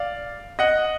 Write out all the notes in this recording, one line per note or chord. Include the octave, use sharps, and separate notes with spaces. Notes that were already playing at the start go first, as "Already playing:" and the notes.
Already playing: D5 F5
D#5 F#5